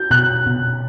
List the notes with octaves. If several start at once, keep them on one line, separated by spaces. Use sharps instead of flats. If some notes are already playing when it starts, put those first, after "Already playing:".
Already playing: F#4 G6
B2 F#6
B2